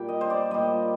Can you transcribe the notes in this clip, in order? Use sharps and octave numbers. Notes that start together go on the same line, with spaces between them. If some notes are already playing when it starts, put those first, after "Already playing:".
Already playing: A#2 G3 G5
D#5
C5
D5
A#2 G3 D#5